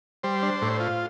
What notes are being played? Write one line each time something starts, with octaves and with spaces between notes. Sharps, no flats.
G3 C5
D4
A2
F4